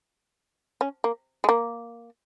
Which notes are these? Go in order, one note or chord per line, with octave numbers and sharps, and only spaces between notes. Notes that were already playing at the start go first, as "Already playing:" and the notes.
C#4
A#3
G#3
A#3